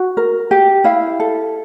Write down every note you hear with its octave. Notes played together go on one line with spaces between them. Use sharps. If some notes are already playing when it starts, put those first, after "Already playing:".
Already playing: F#4
A#4
G4
E4 F5
A4